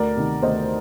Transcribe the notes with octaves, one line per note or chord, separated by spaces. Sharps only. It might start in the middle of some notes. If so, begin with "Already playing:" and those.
Already playing: D2 A#4 D5
C3 D#3
D2 C5 D#5